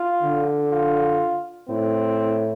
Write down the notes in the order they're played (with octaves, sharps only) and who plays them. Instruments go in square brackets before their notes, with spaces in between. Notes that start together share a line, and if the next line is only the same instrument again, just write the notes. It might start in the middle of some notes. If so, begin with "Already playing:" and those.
Already playing: [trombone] F4
[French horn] D3
[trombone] F4
[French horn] A2 [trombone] C4